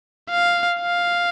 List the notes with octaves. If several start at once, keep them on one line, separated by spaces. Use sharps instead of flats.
F5
F5